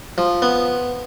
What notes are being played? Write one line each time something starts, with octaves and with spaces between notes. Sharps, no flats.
F3
B3